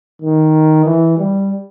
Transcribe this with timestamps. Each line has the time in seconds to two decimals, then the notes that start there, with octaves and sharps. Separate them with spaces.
0.22 D#3
0.86 E3
1.18 G3